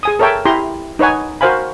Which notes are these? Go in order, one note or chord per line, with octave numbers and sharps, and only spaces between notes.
G#4 G#5 D#6
A4 A#4 C#5 E5 G5 A5
E4 G4 A#5 C6
D#4 B4 C#5 F#5 G#5
F#4 A#4 C5 F5 G#5 B5